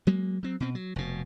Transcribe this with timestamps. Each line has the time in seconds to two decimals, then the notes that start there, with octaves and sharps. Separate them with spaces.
0.07 F#3 G#3 A#3
0.43 F#3 C4
0.60 B2 C4
0.75 F#3
0.96 F1 B2